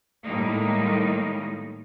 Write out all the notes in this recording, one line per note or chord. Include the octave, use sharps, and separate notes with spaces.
A2 D#3 G3 G#3 A#3 D#4